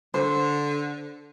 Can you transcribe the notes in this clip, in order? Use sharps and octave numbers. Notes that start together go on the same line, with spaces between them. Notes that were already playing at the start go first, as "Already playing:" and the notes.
D3 C5